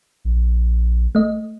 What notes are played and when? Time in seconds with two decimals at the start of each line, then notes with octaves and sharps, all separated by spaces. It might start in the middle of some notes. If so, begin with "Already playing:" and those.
0.25 A#1
1.15 A3 D#5